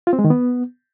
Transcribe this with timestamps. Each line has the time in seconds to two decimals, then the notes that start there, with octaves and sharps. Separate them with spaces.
0.07 F4
0.13 C4
0.19 G#3
0.24 D#3
0.30 B3